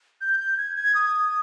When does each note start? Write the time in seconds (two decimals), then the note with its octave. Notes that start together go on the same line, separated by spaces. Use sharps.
0.21 G6
0.40 G6
0.58 G#6
0.76 G#6
0.95 D#6